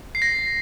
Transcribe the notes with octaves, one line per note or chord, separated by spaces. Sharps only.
C7
A#6